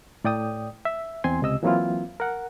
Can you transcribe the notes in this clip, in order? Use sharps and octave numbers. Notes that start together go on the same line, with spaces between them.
A2 D5 G5 D#6
E5
E2 C4 G#5 C6
C#2 C3 D#5 E6
E3 F#3 A#3 C4 E4 F4
A#4 F#5